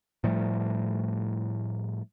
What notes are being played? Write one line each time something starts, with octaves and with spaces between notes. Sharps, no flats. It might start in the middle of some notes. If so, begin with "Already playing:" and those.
A2 F3 G3 A3